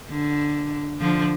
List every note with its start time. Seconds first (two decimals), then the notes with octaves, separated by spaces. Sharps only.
0.10 D3
1.00 D3 F3